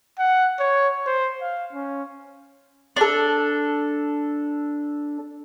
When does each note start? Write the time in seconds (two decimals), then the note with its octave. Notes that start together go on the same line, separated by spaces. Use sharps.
0.19 F#5
0.60 C#5
1.06 C5
1.42 F5
1.73 C#4
2.96 D4 A4